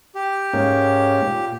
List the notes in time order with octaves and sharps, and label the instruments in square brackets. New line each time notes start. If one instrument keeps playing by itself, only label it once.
[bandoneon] G4
[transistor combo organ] G#2 A#3 C#4
A#2